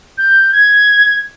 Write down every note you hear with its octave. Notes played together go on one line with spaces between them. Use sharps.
G6
G#6